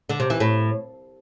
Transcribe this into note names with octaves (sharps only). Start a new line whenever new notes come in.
D3
C3
E3
A2